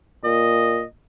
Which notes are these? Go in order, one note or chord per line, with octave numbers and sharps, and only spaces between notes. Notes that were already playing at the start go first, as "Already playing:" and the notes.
A#2 D#5